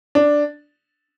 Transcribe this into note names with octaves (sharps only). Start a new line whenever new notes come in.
D4